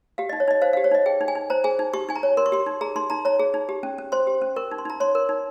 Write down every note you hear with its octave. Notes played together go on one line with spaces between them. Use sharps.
G4 F5
D#5
D#4
C#5
D#4 D#5
C5 F5
F5
G4
C#5
D#4 D#5
G#4 G5
D#4
G#5
D#4
C5 A#5
G#4 G#5
D#4
G4 C#6
D#4 G#5
A#5
C#5
A#4 C6
C#6
G4 C6
D#4
G#4 A#5
D#4 C6
D#4 A#5
C#5 A#5
G#4
D#4
G4
C#4
C#4
C5 C6
G4
C#4
A#4 C#6
D#4
C6
D#4 A#5
C#5 C6
A#4
D#4